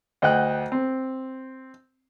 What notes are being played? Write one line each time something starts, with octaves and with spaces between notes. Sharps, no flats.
D2 D#5 F#5 G5 F#6
C4